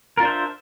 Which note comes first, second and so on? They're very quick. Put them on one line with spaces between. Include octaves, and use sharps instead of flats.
A#4 F4 D4 C5 E5